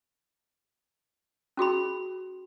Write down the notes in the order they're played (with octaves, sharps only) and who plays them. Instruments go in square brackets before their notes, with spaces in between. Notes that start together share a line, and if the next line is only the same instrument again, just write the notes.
[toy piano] C#4 F#4 G#4 B5